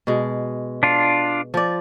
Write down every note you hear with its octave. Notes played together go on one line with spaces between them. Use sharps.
B2 G#3
D4 F4
F3 D5